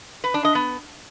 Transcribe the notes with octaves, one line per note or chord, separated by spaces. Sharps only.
B4
D4
D#5
B3